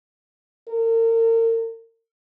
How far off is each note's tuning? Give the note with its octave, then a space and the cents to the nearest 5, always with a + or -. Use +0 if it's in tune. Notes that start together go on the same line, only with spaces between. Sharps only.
A#4 -40